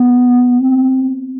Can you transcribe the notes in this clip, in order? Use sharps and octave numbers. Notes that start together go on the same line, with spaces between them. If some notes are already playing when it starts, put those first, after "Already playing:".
Already playing: B3
C4